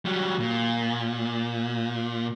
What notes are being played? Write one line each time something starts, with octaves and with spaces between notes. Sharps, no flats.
F#3 G3
A#2